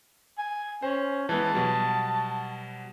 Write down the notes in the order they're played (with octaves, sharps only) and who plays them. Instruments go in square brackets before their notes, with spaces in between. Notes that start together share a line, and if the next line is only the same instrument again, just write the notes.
[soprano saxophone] G#5
[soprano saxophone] C#4 [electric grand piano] C5
[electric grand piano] E3 G#3 B3 [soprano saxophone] A5
[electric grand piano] B2 F#3 G3